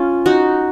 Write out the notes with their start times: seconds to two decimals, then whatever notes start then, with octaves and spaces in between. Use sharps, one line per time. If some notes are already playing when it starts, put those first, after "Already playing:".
Already playing: C#4 F4
0.26 D#4 F#4